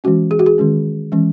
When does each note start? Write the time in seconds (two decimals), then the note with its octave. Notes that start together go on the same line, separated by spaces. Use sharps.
0.04 E3 G#3 C#4 F#4
0.31 G#4
0.39 F#4
0.46 G#4
0.58 D#3 G#3 C#4
1.12 E3 G#3 C#4